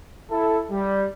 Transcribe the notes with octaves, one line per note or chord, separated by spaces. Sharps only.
E4 A4
G3